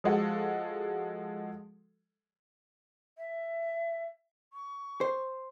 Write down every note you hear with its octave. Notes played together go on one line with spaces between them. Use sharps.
F3 G#3 F#4 A4
E5
C#6
C5